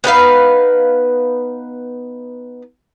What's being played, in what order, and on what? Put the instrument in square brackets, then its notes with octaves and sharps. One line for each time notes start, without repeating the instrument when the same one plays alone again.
[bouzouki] B3 D#4 B4 F5